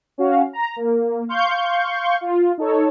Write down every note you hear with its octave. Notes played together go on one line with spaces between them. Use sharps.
C#4 F#4 F5
A#5
A#3
F5 C6 C#6 G6
F4
D#4 A4 C#5